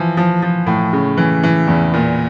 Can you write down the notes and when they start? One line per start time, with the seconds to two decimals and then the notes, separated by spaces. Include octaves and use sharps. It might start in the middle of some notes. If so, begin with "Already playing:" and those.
Already playing: E3 F3
0.17 F3
0.42 F3
0.67 A2
0.93 C#3
1.17 E3
1.43 E3
1.67 E2
1.93 A#2